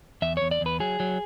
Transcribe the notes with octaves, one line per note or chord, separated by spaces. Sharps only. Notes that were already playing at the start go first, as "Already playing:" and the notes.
E2 E5
E2 C#5
D5
E2 B4
F#3 G#4
F#3